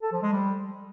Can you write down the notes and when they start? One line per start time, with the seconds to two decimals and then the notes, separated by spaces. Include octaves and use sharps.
0.03 A4
0.13 F3
0.22 G#3
0.32 G3